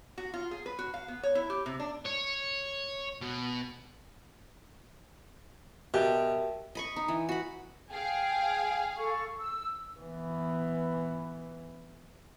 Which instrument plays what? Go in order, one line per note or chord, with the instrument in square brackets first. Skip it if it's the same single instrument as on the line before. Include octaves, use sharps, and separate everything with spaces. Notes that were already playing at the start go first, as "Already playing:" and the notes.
[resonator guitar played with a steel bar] F#4
F4
G#4
B4
F#4
F5
B3
C#5
E4
G4
C3
D4
[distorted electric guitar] C#5
B2
[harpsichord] B2 [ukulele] G4 [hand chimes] A#4 E5 A5
[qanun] D#5 B5 C#6
D#4
E3
F#4 B5
[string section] G#4 F5 [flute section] G5
[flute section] A4 C#6
E6
[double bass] E3 B3